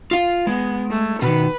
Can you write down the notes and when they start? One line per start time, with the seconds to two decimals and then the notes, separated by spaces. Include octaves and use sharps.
0.11 F4 F5
0.47 G#3 B3
0.90 A3
1.22 B2 D#3 B4